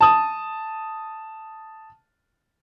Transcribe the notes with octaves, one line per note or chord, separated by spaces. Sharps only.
A5 D#6